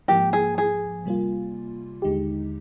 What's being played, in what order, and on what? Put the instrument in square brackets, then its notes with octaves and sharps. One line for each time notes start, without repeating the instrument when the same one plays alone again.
[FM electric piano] G#2 F3 A#3 [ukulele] G4
[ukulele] G#4
G#4
[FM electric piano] C3 G3 A#3 F4
D#2 D3 G#3 D#4 G4